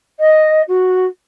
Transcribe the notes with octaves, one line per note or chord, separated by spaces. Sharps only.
D#5
F#4